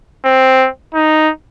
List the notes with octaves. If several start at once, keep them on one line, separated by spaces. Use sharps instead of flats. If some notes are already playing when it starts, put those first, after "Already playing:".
C4
D#4